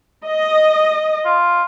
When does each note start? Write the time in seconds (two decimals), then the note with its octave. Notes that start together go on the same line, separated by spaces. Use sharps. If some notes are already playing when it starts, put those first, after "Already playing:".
0.24 D#5
1.25 F4